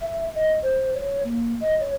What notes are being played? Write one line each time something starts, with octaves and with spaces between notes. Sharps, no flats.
E5
D#5
C5
C#5
A#3
D#5
C#5